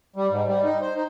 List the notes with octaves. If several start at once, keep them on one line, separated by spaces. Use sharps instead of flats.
G3
G#2
G3
D#4
C5
D#4